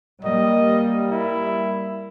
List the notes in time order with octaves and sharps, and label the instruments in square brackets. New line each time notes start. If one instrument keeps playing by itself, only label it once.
[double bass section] G3 A#3 [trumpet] D#5
[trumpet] E4